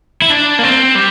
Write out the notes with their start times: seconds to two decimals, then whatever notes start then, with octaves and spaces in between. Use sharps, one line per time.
0.22 E4
0.30 D4
0.59 A#3
0.63 C4
0.95 G3